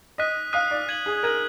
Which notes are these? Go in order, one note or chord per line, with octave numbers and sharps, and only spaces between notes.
D#5 D#6 F#6 B6 D#7
F5 D#6 F#6 B6 D#7
D5
G#6 D#7 F#7
G#4
A#4 G#6 D#7 F#7